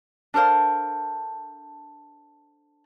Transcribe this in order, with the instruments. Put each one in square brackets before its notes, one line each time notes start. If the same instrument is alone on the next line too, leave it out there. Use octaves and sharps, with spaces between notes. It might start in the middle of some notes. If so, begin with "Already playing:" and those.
[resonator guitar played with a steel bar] D4 A4 A#4 C5 F5